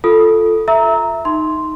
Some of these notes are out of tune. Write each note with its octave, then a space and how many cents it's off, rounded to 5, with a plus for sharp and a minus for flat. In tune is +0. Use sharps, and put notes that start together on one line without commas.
F4 +0 A4 +0 D#6 +0
E5 +0 A#5 +0 E6 -30
D#4 +0 C6 +0